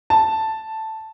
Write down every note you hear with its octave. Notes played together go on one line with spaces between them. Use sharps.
A5